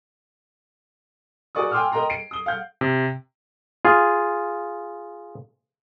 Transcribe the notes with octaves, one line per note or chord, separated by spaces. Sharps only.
F#4 G#4 A#4 D5 C#6 D#6
G5 G#5 C6 D6 E6 F6
A#4 D#5 G5 A#5 C6
C7 D7
D#6 G7
F5 F#5 G6
C3
F4 G#4